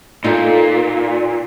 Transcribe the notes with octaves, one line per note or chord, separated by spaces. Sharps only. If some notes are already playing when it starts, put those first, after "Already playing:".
A#2 D#4 F4 A4